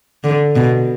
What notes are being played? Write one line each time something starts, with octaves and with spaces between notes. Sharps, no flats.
D3
B2